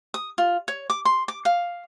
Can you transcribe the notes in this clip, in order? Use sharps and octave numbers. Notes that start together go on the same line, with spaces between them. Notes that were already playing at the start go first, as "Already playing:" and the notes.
D#6
F4
C#5
D6
C6
D6
F5